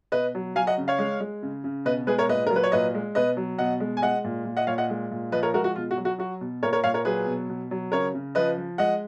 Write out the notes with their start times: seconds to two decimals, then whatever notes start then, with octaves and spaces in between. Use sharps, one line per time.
0.12 B2 B4 D#5
0.35 F#3
0.55 F#3 F5 G#5
0.67 D#5 F#5
0.78 C#3
0.88 C#5 F5
0.99 G#3
1.20 G#3
1.43 C#3
1.64 C#3
1.85 B2 B4 D#5
2.07 G#3 G#4 B4
2.18 A#4 C#5
2.29 A#2 B4 D#5
2.47 A#4
2.50 F#3
2.56 B4
2.64 C#5
2.72 A#2 B4 D#5
2.95 G#3
3.15 B2 B4 D#5
3.37 F#3
3.58 B2 D#5 F#5
3.80 G#3
3.97 G#5
4.02 G#3 D#5 F#5
4.24 A#2
4.45 A#2
4.57 D#5 F#5
4.67 A#2 C#5 F5
4.78 D#5 F#5
4.90 G#3
5.11 A#2
5.32 F3 B4 D#5
5.43 A#4 C#5
5.53 G#3 F#4 A#4
5.64 F#4
5.76 B2 F4
5.91 F#4
5.97 F#3
6.05 F#4
6.18 F#3 F#4
6.41 B2
6.63 A#2 A#4 C#5
6.73 A#4 C#5
6.84 A#2 C#5 F5
6.94 A#4 C#5
7.05 F#3 G#4 B4
7.27 B2
7.50 B2
7.71 F#3
7.92 C#3 A#4 C#5
8.14 C#3
8.35 F3 B4 D#5
8.58 F3
8.78 G#3 D#5 F#5